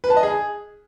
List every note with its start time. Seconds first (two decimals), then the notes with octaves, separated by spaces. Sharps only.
0.04 B4
0.10 A5
0.17 D#5
0.23 G#4